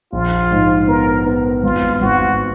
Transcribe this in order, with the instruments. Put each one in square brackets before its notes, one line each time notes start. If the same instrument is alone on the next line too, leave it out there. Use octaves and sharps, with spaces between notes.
[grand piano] A#1 [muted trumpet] F4
[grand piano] G#2
[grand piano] B3 [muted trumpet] A#4
[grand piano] B3
[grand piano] G#1 [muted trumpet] F4
[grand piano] G#1 [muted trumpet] F#4